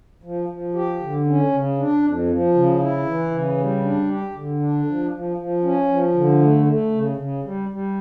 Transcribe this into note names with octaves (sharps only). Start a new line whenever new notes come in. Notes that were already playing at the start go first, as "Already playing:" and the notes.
F3
F3
G4
D3
C#4
C#3
D4
F2
F3
C#3
E4
E3
C#3
G3
D4
G4
D3
D4
F3
F3
F3
C#4
F3
D3
A3
A3
C#3
C#3
G3
G3